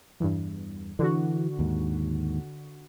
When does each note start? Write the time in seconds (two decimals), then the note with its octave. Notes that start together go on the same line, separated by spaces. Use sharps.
0.20 E2 G2
0.99 D3 E3 F#4
1.59 D#2 G#2